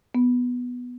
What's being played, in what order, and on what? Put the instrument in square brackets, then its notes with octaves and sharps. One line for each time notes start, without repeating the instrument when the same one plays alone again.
[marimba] B3